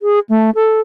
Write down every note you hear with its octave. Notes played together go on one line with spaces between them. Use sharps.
G#4
A3
A4